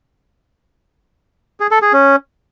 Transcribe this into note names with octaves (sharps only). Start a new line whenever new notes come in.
G#4
A4
G#4
C#4